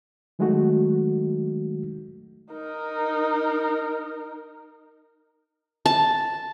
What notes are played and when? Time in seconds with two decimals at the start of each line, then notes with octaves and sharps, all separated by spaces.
0.39 D#3 F#3 G#3 A3 D#4 F#4
2.52 D#4 A#4
5.86 A5